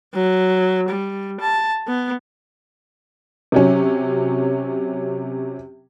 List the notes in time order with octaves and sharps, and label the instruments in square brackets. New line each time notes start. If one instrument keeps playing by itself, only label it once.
[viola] F#3
G3
A5
B3
[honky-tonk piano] C3 F#3 C#4